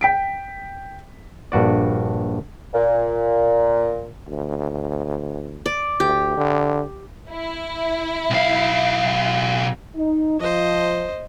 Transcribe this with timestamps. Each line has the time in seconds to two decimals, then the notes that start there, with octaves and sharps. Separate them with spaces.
0.01 G5 B6 D7
1.52 A#1 G2 F#4 D5
2.73 A#2
4.28 D2
5.66 D5
6.00 D2 G4
6.37 D3
7.30 E4
8.30 B1 F5
9.96 D#4
10.40 F3 C5 D#5